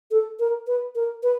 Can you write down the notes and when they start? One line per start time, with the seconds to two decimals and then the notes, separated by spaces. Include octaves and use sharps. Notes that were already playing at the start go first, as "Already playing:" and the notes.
0.11 A4
0.40 A#4
0.67 B4
0.95 A#4
1.23 B4